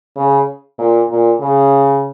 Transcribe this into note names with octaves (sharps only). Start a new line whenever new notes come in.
C#3
A#2
A#2
C#3